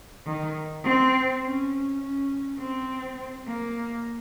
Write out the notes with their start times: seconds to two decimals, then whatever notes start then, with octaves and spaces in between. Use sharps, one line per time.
0.26 D#3
0.84 C4
1.43 C#4
2.01 C#4
2.59 C4
3.47 A#3